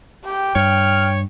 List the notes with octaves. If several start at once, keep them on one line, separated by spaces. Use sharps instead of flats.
G4 G5
G2 C#5 F6